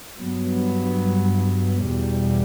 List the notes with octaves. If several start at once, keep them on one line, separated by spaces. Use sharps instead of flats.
G2 F#3 B3
E2 B2 G3